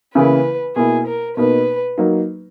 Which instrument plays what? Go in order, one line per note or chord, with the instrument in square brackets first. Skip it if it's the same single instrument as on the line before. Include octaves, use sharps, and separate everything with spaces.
[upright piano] C#3 E3 A#3 E4 [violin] B4
[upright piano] B2 A#3 E4 [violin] G#4
[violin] A#4
[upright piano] B2 A#3 D#4 [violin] B4
[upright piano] F#3 A#3 D#4